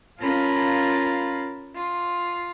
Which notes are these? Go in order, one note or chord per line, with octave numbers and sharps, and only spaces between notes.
C#4 F4 A#4 F5 A5 B5
F4